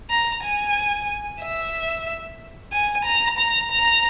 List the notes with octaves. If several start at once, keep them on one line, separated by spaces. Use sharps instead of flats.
A#5
G#5
E5
G#5
A#5
A#5
A#5